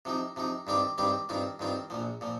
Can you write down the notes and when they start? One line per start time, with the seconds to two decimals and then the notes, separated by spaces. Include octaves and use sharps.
0.05 C3 F3 D#4
0.36 C3 F3 D#4
0.67 G2 D#3 G3 C4 G4
0.98 G2 D#3 G3 C4 G4
1.29 G2 D#3 C4 F4
1.59 G2 D#3 C4 F4
1.90 A#1 A#2 F3
2.21 A#2 F3